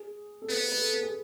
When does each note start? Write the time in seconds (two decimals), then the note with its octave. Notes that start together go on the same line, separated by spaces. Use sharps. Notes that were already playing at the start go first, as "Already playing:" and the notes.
Already playing: G#4
0.42 A4
0.49 B3 B4
0.61 B4
0.72 B4
0.81 A4
0.93 B4
1.03 G#4